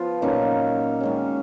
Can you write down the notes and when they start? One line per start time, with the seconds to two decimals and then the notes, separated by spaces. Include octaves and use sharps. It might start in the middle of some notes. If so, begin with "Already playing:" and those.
Already playing: F3 B3 F4
0.22 A#2 F#3 A#3 C#4 D#4
1.01 D#3 G#3 C#4